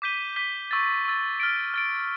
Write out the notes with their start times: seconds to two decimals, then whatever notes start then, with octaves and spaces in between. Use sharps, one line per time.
0.02 D6 G6 B6 D#7 G7
0.36 D6 G6 B6 D#7 G7
0.71 C#6 E6 A6
1.05 C#6 E6 A6
1.40 F6 A6 D7
1.74 F6 A6 D7